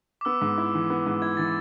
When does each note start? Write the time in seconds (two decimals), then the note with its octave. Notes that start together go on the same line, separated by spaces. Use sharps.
0.21 D6
0.25 B3 E6
0.42 G#2
0.58 E4
0.75 E3
0.90 B3
1.06 G#2
1.22 E4 G#6
1.37 E3 A6